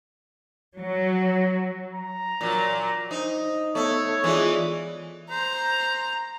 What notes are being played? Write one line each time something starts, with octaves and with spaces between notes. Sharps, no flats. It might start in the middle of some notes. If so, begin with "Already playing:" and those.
F#3
A#5
A#2 F#3
D#4 C5
A3 B3 A4 C#5 E6
E3 G#3 F4 G#4 D5
C5 A#5